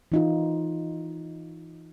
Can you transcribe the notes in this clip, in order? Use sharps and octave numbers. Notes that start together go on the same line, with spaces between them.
E3 D#4 F4